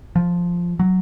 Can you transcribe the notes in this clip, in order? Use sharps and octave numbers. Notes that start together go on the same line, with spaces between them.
F3
F#3